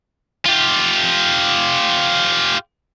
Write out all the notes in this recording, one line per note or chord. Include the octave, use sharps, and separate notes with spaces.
F4 G4